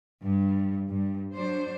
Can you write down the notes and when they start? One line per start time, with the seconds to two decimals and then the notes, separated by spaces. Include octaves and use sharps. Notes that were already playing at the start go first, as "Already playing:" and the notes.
0.23 G2
0.89 G2
1.34 F#3 D4 C5